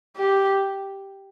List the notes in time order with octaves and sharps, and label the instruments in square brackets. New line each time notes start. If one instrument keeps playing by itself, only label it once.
[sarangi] G4